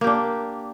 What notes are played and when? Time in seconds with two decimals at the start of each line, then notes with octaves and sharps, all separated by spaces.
0.01 A#3
0.04 G4
0.07 D4